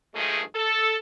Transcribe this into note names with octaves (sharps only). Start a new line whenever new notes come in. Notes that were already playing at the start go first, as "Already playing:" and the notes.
G2 D#3 F3 G#3 A3 G#4
A4